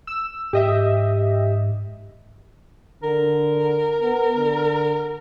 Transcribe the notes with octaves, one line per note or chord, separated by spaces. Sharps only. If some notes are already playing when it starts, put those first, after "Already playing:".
E6
G#2 G4 D#5 E5
D3 A#4
B3
D3